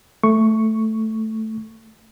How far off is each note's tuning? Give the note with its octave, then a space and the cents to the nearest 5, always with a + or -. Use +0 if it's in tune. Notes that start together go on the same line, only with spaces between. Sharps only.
A3 +0 C#6 +0